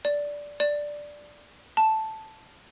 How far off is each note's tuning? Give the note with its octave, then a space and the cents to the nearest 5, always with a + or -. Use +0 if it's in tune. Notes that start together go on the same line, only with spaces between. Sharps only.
D5 -10
D5 +0
A5 -5